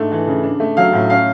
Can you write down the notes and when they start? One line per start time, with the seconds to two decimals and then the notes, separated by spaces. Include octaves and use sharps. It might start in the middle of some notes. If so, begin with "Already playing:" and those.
Already playing: G#2 A3 D4
0.12 E3
0.27 C#3
0.43 D4
0.60 A3
0.77 F#3 F5
0.93 A2
1.10 C#4 F5